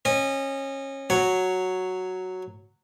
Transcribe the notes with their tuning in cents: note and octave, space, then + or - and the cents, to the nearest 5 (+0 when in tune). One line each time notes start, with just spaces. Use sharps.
C#4 -25 D#5 -20
F#3 +0 C#5 +0